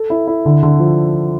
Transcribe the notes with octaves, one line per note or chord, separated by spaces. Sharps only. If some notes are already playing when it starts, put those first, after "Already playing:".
Already playing: A4
E4
E4
D3
D3
F3